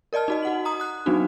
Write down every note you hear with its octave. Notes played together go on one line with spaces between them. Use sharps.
A#4 D5 D#5 A5 F6
D#4 F#4 D#5
F#4 F#5 F#7
A#5 D#6
D#6 F#6
F#3 B3 C4 D4 D#4 F#4